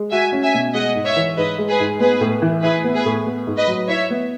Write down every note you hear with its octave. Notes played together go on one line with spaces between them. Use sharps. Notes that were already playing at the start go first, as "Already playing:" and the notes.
Already playing: G#3
F#4 E5 G#5
C#4
E5 G#5
B2
G#3 D#5 F#5
G#2
C#5 E5
E3
G#2 B4 D#5
G#3
G#4 B4
G#2
B3 G#4 B4
A2
E3
E4 G#4 B4
B3
G#4 B4
A2
B3
G#2
B4 D#5
F#3
E4 C#5 E5
B3